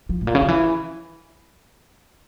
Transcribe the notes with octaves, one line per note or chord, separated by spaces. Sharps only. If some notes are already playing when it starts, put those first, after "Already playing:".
F3
A2
A#2
C#3
D3
E3